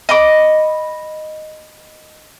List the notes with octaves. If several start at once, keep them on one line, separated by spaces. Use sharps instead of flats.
D#5 B5 D6